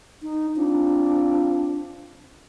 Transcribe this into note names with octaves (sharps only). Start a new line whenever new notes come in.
D#4
C4 D4 F4